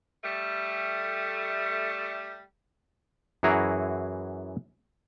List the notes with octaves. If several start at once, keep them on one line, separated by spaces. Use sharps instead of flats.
G3 A3
F#2 E3 E4 F#4 G#4 A#5